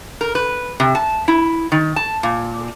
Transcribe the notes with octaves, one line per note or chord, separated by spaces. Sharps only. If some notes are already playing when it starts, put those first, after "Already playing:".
A#4
B4
C3
A5
E4
D#3
A5
A#2